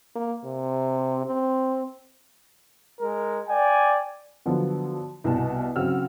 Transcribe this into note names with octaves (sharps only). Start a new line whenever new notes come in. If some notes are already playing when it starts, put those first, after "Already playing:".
A#3
C3
C4
G#3 A#4
D5 G5 G#5
D3 F3 F#3 B3
C2 B2 G#5 A5
C#3 F#3 C4 F#5 E6 F6